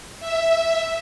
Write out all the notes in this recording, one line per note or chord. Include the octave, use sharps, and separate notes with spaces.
E5